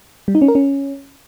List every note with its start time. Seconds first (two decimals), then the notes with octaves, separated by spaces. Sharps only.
0.28 G3
0.35 D#4
0.41 C#4
0.48 A#4
0.55 C#4